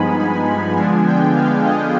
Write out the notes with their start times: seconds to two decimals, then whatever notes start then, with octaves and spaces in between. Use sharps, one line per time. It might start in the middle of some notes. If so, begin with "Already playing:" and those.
Already playing: G2 F3 G#3 B3 D#4 G#5 B5
0.19 G#5
0.48 B5
0.77 D3 F3 G#3 B3 D4 G#5
1.06 G5
1.36 F5
1.65 D#5